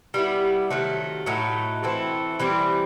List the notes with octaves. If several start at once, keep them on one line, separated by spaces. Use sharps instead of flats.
G3 B3 E4
C3 D#3 F#3 A3
A2 F#3 A3 D#4
E3 A3 C4 E4
E3 G3 C4 E4